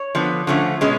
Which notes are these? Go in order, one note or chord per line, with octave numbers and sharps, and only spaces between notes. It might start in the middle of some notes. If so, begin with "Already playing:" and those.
Already playing: C#5
D3 F3 B3
D3 F3 A3 C#4
B2 G#3 C#4